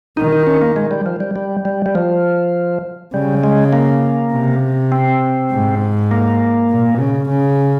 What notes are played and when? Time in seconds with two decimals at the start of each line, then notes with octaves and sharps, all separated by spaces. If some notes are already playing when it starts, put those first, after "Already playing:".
0.17 D#3 D#4
0.32 D#4
0.47 C#4
0.62 A#3
0.76 G#3
0.91 G3
1.06 F3
1.20 G3
1.36 G3
1.65 G3
1.86 G3
1.95 F3
3.14 C#3 G3
3.44 G#3
3.73 A#3
4.33 C3
4.92 C4
5.52 G#2
6.11 A#3
6.70 A#2
7.00 C#3
7.29 C#3